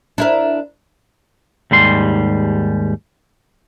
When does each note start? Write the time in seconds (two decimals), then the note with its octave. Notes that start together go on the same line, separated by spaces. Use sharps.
0.18 D4 E4 A#4
1.71 D#2 G#2 G3 C6